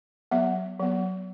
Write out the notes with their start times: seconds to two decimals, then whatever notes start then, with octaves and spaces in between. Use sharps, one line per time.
0.31 F#3 B3 E5
0.80 F#3 B3